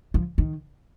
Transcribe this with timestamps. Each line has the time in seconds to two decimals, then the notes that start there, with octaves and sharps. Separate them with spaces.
0.14 F3
0.38 D#3